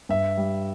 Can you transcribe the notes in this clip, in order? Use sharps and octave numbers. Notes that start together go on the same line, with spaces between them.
G2 E5
G3